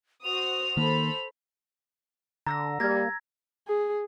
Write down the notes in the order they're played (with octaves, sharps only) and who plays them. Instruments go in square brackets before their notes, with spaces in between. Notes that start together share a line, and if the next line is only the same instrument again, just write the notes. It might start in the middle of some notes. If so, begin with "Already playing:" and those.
[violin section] F#4 C5 D#6 [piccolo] F7
[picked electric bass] D#3 A#3 [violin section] A4 C5 B5
[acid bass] D3 [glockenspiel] A#5 E6 A#6
[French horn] G3 [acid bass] A#3 [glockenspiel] G#6 A#6
[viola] G#4